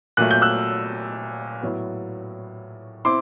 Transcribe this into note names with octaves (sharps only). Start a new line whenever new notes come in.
A#2 F#3 A3 F#6
G6
E6 F#6
A2 F#3 B3
C4 E4 C6 D6